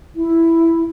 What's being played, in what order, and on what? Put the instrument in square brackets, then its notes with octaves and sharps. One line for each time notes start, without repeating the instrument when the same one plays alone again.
[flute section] E4